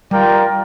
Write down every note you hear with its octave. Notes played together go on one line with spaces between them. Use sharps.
G3 F4 A#4 D5 G5